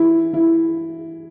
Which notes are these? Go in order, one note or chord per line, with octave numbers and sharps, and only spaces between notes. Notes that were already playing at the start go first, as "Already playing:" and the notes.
Already playing: E3 E4
E3 E4